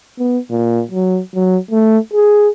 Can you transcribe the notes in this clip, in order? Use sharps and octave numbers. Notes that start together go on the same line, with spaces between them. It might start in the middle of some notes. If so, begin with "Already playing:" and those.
B3
A#2
F#3
F#3
A3
G#4